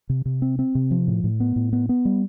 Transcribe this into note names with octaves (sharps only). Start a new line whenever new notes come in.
C3
C3
C4
C4
C3
F3
A2
A2
B3
A2
B3
B3
G3